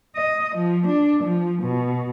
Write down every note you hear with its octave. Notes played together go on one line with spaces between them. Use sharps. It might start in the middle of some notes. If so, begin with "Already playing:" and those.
D#5
F3
D4
F3
B2